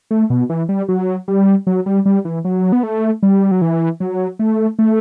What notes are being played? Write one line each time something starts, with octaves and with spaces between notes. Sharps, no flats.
A3
B2
E3
G3
F#3
G3
F#3
G3
G3
E3
F#3
B3
A3
G3
F#3
E3
F#3
A3
A3